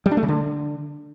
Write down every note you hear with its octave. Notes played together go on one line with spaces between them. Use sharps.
G3
D4
A3
C#3
D3